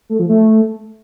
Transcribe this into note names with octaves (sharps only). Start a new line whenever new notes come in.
A3
F3
A3